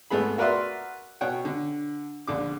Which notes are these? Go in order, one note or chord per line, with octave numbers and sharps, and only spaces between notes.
G#1 A3 B3 G#4 B5
F#4 A#4 B4 D5 E5 C6
B2 C#5 F#5 G5
D3
A#1 D3 D6